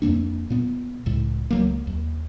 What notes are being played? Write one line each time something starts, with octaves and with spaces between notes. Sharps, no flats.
F2 A#2 A#3 D4
A#2 B3
C#2 A2
C#2 F#3 A#3
D#2